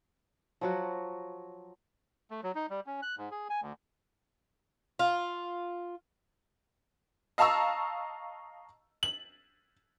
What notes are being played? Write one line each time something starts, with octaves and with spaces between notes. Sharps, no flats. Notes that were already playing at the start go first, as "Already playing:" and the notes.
F3 F#3 F#4
A3
F#3
D#4
G3
C#4
F#6
G#2
G#4
G#5
D2
F4
D#5 F5 A5 A#5 C#6 E6
F#7